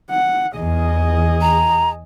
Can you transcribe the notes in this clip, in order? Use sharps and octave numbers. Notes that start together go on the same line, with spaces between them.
F#5
E2 G#4 D#5
A#5